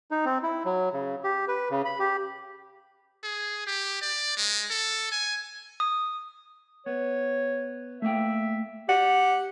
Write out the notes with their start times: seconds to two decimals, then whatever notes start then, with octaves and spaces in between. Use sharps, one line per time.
0.11 D#4
0.25 C4
0.43 E4
0.65 F#3
0.93 C#3
1.24 G4
1.48 B4
1.70 C#3
1.85 B5
1.99 G4
3.23 G#4
3.67 G4
4.02 D5
4.37 G#3
4.70 A4
5.12 G#5
5.80 D#6
6.86 B3 C#5
8.02 A3 A#3 E5 G5
8.89 G4 D5 F#5